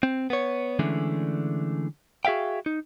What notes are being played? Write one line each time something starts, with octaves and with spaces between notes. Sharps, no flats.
C4
B3 C#5
D3 E3 G#3 A3 C#4 D4
F#4 G#4 E5 F5 G5
D#4